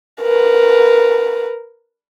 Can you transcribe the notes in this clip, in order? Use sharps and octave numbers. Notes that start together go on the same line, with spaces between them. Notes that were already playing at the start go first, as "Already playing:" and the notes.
A#4 B4